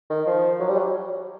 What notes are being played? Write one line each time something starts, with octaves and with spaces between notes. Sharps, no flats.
D#3
F3
F#3
G3
F#3